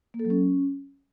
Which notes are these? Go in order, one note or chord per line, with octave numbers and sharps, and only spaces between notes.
A#3
A4
F#3
C#4